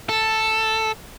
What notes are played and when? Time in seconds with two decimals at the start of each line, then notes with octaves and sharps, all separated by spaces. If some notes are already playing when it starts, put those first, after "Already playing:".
0.09 A4